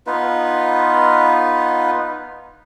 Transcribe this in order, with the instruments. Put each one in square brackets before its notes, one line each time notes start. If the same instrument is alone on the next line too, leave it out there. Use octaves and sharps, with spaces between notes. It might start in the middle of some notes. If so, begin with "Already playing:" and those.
[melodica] B3 D#4 F4 B4